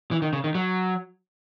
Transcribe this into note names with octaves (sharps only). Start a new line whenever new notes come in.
E3
D#3
C#3
D#3
F#3